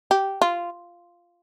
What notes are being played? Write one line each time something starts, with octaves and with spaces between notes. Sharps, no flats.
G4
F4